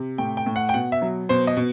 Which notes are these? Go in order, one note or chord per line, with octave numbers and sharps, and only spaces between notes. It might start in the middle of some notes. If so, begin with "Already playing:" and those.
Already playing: C3
A2 G5
G5
A2
F#5
G5
B2 F#5
E5
F#3
B2 C5
D#5
B2